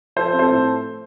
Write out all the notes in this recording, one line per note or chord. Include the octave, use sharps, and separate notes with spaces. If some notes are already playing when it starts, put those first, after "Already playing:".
F3 A4 C5
C4
A4 C5
A2